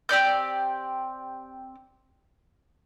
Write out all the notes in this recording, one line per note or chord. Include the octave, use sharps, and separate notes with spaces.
C4 G4 D5 G6